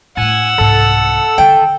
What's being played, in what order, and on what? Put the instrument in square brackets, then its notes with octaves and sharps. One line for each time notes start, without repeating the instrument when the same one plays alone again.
[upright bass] A2 A3 [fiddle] F#5 E6 [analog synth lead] G#5
[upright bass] C2 G#2 [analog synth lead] A4
[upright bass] D3 D#3 [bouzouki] G5